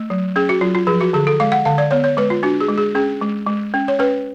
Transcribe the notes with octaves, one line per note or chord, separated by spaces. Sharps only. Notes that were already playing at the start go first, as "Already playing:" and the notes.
Already playing: A3
F#3
C#4 G#4
F#4
F#3 F4
F4
F3 G#4
F#4
D3 G#4
A4
G#3 F5
F#5
D3 F5
D5
B3 C#5
C#5
G#3 B4
F4
D4 F#4
G#4
G#3
G#4
C#4 G#4
G#3
G#3
C#4
C#5
C#4 B4